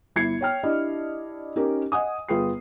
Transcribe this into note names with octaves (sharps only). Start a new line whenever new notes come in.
G1 E4 G#6 C7 C#7
C#5 G5 F6
D4 E4 G4 D5 D#5
C#4 D#4 G4 A#4
D#5 F#5 G#5 D#6
G1 F4 G#4 B4 G5 C7